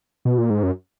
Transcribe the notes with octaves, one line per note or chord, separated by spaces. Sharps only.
B2
A#2
G#2
F#2